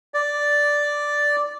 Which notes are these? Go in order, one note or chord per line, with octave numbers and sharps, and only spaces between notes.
D5